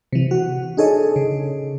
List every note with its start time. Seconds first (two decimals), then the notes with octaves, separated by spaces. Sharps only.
0.13 C3 E3
0.31 F#4
0.77 D4 D#4 G#4 A4 C#5 D#5
1.16 C#3